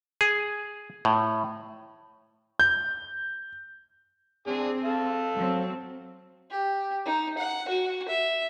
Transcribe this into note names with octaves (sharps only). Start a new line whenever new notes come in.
G#4
A2
G6
C4 D4 G#4
A4 F5 A5
F#3 C4
G4
D#4
F#5
F#4
E5